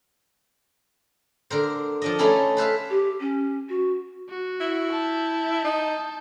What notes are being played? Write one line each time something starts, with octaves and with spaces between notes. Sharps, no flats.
D3 A#4 C5
F3 D4 D#5
A3 C#4 D#4 E4 G#4 A4
B4 C5 E5 F5
G4
C#4
F#4
F#4
E4
A5 G6
D#4